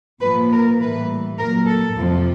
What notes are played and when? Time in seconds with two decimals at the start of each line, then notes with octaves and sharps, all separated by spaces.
0.22 A#2 F3 B4
0.52 A#4
0.80 A2 E3 G3 B4
1.38 A#2 F#3 A#4
1.67 A4
1.96 F2 C3 F3